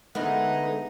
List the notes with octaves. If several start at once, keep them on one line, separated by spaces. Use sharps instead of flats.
D3 G#3 A3 B3 D#4 A#4 B4